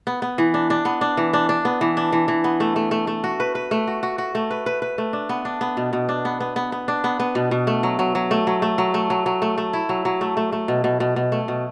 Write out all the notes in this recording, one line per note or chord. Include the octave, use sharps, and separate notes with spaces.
B3
B3
E3
D4
D4
B3
D4
E3
D4
D4
B3
E3
D4
E3
E3
B3
A3
A3
A3
A3
F#4
B4
B4
A3
F#4
F#4
F#4
A3
B4
B4
B4
A3
D4
B3
D4
B3
B2
B2
D4
B3
B3
B3
B3
D4
B3
B3
B2
B2
A3
F#3
F#3
F#3
A3
F#3
A3
F#3
A3
F#3
F#3
A3
A3
E4
F#3
F#3
A3
A3
A3
B2
B2
B2
B2
A3
B2